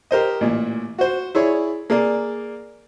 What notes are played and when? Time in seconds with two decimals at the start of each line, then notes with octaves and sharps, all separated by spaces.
0.11 G4 A#4 C5 D#5
0.41 A1 A#2
0.98 F#4 C5
1.35 E4 G#4 C#5 D5
1.90 A#3 G#4 A#4 D5